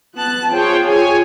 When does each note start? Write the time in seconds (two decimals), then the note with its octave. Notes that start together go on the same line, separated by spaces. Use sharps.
0.15 B3 A5 F#6
0.50 F4 G#4 C5 C#5 G5
0.84 C#5 G#5